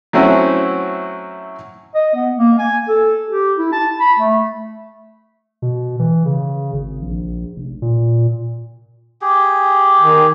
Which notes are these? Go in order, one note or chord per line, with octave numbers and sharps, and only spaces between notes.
F#3 A3 C4 C#4 E4 F#4
D#5
B3
A#3
G#5
A4
G4
E4
A5
B5
A3
B2
E3
C#3
G#1
A#1
F1
A#2
G4 G#4
D#3